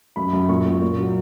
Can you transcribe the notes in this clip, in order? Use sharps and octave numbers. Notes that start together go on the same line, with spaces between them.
F#2 B5
F#2
A#2 C#6
A#2
A#2
F#3